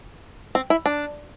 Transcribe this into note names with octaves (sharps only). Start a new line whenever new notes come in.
C4
E4
D4